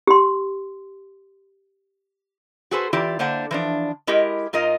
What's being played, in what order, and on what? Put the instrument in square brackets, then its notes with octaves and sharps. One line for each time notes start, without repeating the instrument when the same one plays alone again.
[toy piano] G4 C6
[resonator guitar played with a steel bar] F#4 G#4 A4 B4 C5
E3 E4 F4 G4 D5
D3 A#3 D4 C5 F#5
E3 F3 D4
G#3 E4 G4 A#4 D#5
G#2 F4 A#4 D#5